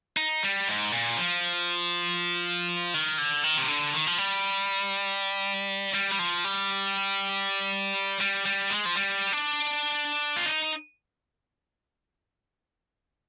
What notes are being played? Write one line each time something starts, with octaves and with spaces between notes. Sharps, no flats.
D#4
G3
G#2
A#2
F3
D#3
D3
D#3
C3
D3
D#3
F3
G3
G3
G3
F3
G3
G3
G3
G#3
F3
G3
D4
F4
D#4